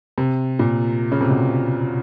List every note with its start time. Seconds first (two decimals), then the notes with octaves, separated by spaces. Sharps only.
0.18 C3
0.59 A#2
1.12 C#3
1.21 C3
1.30 B2